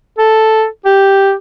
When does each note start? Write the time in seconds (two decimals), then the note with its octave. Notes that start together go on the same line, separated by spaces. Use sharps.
0.18 A4
0.85 G4